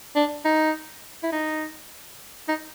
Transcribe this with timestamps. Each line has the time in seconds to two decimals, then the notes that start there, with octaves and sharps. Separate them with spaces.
0.16 D4
0.45 D#4
1.23 E4
1.32 D#4
2.48 D#4